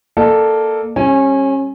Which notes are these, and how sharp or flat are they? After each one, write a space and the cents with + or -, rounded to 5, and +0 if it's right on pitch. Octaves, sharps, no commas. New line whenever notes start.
A#3 +0 A4 +0 D5 +40
G3 +0 C#4 -30 G#5 +0